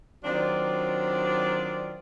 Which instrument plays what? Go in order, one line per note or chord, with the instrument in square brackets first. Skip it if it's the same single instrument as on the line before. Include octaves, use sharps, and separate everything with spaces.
[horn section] D#3 F#3 C4 D4 F4 D5